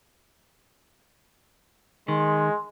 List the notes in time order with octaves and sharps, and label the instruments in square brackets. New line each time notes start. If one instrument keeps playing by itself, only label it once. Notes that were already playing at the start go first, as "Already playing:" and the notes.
[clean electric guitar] D#3 [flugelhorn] G#3 [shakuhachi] C6